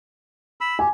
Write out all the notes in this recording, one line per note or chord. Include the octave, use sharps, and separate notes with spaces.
B5 E6
G4 G#5